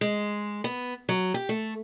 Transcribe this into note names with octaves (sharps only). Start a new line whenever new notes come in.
G#3
B3
F#3
G4
A3